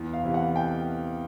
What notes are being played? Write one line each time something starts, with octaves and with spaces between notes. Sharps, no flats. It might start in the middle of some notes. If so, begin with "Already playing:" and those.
Already playing: E2
F5
C3 E3
F#5
G5